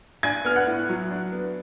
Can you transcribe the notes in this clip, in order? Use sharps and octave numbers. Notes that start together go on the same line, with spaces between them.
D4 G#5 G#6
B3 F6
F#5 F#6
A2
F#3
D4
B3